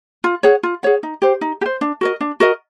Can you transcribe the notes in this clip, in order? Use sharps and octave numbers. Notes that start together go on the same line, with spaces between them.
F4
G#4 C#5 F#5
F4
G#4 C#5 F#5
D#4
G4 C5
D#4
G4
C5
D4
F#4 A#4 D#5
D4
F#4 A#4 D#5